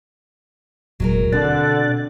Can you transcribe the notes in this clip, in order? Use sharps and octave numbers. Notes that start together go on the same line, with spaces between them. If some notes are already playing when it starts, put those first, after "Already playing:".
F1 D#2 A#2 F#3 G#3 A#4
B2 D3 C4 D5 F#6 A6